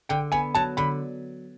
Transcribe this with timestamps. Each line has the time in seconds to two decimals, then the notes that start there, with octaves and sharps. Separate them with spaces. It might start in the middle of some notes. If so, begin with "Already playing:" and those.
0.09 D3 G5
0.32 B3 G#5
0.55 F#3 A5
0.77 D3 B5